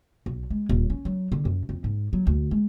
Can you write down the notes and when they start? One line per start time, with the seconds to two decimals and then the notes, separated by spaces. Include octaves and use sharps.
0.26 B1
0.50 G#3
0.69 D#1
0.90 C#4
1.05 F#3
1.32 D3
1.45 F#2
1.69 F2
1.84 G#2
2.13 F#3
2.27 D2
2.51 G#3